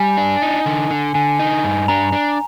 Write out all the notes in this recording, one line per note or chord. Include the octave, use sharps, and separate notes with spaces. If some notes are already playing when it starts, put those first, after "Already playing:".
Already playing: G3 G#5
D4
D#4
D3
D3
D3 G#5
D#4
G2
D4 A#5
D4